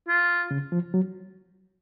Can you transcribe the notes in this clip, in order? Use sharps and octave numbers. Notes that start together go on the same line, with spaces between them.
F4
C#3
F3
F#3